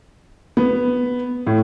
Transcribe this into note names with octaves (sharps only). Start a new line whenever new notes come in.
B3
A2